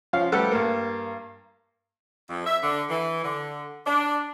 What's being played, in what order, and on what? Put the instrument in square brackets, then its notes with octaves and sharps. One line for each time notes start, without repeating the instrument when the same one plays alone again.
[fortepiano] F3 C#4 F5
G3 A3 G4 A4 B4 F#5
G2 A#3
[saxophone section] F2
E5
D3
E3
D3
D4